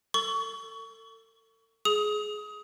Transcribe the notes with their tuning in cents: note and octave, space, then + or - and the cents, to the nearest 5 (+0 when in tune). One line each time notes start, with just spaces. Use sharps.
A4 +40 C#6 +25
G#4 +20 D#6 +25